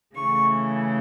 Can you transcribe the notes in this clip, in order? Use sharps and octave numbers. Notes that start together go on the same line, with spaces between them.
C#3 E3 A3 C#6